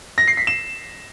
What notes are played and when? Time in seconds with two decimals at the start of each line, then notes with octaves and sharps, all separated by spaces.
0.18 A#6
0.28 C7
0.37 B6
0.47 E7